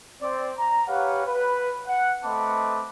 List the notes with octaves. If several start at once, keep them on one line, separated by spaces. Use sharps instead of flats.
C4 D5
A#5
G4 B4 C#5 F5 F#5
B4
F#5
A3 C4 B4 D#5 A5 D6